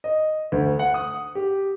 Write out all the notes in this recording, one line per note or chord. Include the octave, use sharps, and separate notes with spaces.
D#5
D2
F#5
D#6
G4